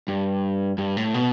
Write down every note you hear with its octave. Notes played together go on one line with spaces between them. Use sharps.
G2
G2
A2
B2